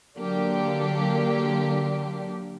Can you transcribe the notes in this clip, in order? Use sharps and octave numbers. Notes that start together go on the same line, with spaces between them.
D3 F#3 A#3 D4 G4